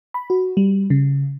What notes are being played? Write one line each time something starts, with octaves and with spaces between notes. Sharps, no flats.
B5
F#4
G3
C#3